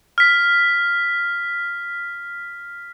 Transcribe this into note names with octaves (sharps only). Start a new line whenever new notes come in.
F6 B6